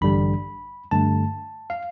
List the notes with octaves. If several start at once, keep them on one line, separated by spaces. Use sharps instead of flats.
A1 G2 D3 G3 D4 B5
G2 D3 A3 A5
F5